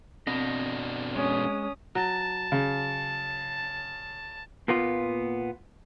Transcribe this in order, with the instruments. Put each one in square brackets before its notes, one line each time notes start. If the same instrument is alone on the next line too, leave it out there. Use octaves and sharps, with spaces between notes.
[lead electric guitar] B2 D4 [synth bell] C4 [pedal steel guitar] D#5
[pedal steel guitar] G#3 [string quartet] C#4 D#6
[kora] F#3 [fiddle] A5
[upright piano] C#3
[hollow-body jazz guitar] A#2 A#3 B3 F4